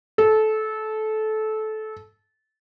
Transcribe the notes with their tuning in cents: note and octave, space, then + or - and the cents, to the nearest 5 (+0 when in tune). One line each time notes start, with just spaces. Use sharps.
A4 -20